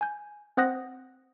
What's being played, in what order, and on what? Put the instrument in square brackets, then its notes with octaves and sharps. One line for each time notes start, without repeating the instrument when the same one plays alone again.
[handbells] G#5 G6
C4 C5 F#5 D#6 F#6 A#6